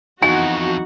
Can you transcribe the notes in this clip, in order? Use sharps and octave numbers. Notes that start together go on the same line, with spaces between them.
F2 E3 B3 D#4 F#4 G#5